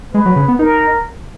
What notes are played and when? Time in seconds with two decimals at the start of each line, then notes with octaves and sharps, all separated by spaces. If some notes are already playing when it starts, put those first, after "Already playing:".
0.14 G#3 B4
0.26 F#3
0.36 C#3
0.48 B3
0.59 D#4 A#4